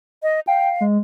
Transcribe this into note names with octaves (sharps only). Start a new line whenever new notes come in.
D#5
F5 G5
G#3